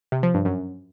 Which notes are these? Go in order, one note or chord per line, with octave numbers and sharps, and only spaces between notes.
C3
F3
G2
F#2